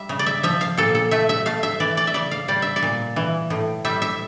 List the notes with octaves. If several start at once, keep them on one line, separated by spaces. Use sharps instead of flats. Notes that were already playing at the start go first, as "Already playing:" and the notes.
Already playing: G3 E5
C#3
D5
E5
F3 E5
F5
A#2 A4
A4
A3 E5
E5
A3 F5
E5
E3 D5
D5
E5
C#3 D5
F5
G3 D5
E5
D5
A#2
E3
A2
G3 E5
E5